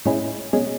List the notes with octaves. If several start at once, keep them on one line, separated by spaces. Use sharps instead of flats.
A2 G#3 C#4 E4
B2 G#3 C#4